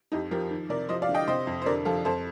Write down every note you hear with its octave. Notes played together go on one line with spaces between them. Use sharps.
F2 D#4 G4
F3 G4 A#4
D#3
C3 A#4 D5
F3 C5 D#5
D5 F5
D3
D#5 G5
C3 C5 D#5
F2
C5
D3 A#4 D5
F3 F4 A4
F2 A4 C5